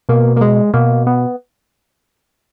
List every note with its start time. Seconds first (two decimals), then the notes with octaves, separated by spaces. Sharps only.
0.09 B2 A#3
0.37 A#3
0.41 G#3
0.74 B2 A#3
1.07 B3